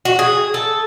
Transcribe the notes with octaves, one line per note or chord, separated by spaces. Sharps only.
F#4
G#4
A4